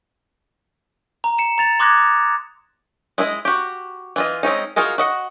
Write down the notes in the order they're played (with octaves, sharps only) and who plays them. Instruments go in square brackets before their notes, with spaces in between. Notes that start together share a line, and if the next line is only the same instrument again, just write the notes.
[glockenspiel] A#5
C#7 E7
A#5 A6 F7
C6 D6 D#6 F#6 G#6 A#6
[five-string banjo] G#3 E4 C5 D#5
F#4 G4
E3 F4 D#5
G#3 C4 C#4 D#4
D#4 F4 F#4 G#4 A#4
F#4 D#5 F#5